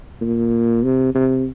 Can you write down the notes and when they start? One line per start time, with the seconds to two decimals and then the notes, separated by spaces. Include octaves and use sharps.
0.21 A#2
0.83 C3
1.14 C3